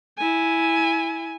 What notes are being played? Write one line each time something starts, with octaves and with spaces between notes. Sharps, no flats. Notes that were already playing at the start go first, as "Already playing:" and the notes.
E4 G#5